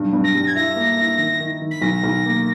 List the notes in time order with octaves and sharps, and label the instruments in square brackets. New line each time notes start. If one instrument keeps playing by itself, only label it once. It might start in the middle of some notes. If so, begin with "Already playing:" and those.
Already playing: [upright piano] B1 G2
G2
[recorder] A#6
[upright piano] G3
[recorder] G#6
[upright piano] E4 [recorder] A#6
[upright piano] A#3
E4
D#3
D#3
D#3
[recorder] B6
[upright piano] B1 [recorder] A#6
[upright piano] B1
A#3